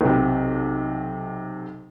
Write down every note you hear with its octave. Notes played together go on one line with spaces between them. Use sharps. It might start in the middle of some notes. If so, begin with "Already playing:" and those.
B1 C3